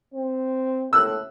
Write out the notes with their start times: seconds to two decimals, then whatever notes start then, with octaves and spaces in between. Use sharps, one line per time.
0.14 C4
0.93 A2 E6 F#6